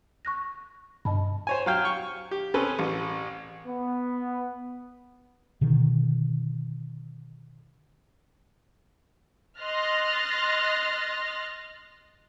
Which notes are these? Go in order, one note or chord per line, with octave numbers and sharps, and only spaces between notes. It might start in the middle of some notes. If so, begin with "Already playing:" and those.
C#6 F#6 A#6
G2 D#5 A5 B5
C5 C#5 G#5
F#3 F5 G5
C#6
G4
C4 C#4 G#4 A4 B4
A1
B3
B2 D3 D#3
D#5 C6 F6 F#6 A6 A#6